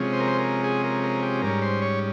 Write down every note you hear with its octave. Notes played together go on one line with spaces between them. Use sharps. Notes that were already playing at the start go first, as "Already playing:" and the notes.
Already playing: C3 F3 G#3 C#4
C5
A#4
C5
A#4
G#4
A#4
A#4
G4
G#2 G3 C#4 A#4
C5
C#5